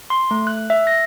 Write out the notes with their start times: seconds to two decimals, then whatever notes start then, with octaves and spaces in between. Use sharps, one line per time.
0.10 C6
0.31 A3
0.47 F#6
0.70 E5
0.87 A#6